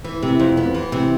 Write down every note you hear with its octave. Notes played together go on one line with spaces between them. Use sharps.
E3
C3
F2
B3
E3
C3